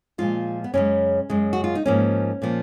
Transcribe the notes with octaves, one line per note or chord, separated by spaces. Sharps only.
A#2 F3 G#3 F4
B3
F#2 C#3 G#3 C#4
F#2 C#3 G#3
F#4
F4
D#4
G#2 F3 A#3 C#4
A#2 F3 A#3